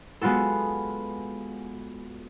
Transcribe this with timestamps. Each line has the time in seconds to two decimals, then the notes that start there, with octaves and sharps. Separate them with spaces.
0.21 G#3 B3 F4 F#4 A4